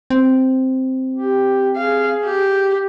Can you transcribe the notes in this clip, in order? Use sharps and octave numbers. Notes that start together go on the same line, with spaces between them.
C4
G4
G#4 F5
G4